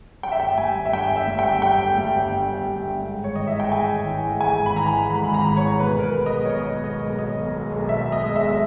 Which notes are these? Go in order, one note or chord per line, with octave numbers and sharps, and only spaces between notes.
G2 G5
E5
G1 G5
G3 G#5
G1
E5
G2 G5
G1
E5
G3
G5
G1
G2 G5
G1
G3
G1
G2
G1
G3
G1
G#2
G#1
C#5
E3 D#5
E5
G#3
G5
G#2 G#5
G#1
E3
G#3
G#2 G#5
G#1
B5
E3 A#5
G#3
G#2 B5
G#1 B5
A#5
E3
C#5
G#3
B2 B4
B1 A#4
B4
G#3
D#5
B1
C#5
B2 D#5
B1
G#3 D#5
B1
B2 D#5
B1
G#3
B1
B2 E5
B1
D#5
G#3
B1 E5
E5